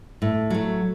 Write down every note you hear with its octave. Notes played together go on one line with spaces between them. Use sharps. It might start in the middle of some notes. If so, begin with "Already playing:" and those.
A2
F#3 A3